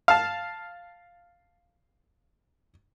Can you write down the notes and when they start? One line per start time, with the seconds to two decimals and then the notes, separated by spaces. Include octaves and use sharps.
0.08 F5 A5